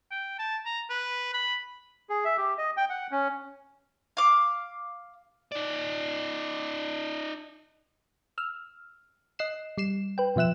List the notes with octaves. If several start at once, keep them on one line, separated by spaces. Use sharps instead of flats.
G5
A5
A#5
B4
B5
G#4
E5
G4
D#5
G5
F#5
C#4
F5 D6
D#4 D5
E6 F6
D#5 F#6 C7 E7
G3 C7 E7
B4 G5
B2 F3 E5 F#6 E7